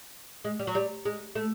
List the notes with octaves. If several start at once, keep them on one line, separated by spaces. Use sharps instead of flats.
G#3
G3
F#3
G3
G#3
A3